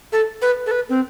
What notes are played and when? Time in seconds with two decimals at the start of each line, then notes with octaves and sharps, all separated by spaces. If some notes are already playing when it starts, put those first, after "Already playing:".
0.12 A4
0.42 B4
0.66 A4
0.71 B4
0.89 C4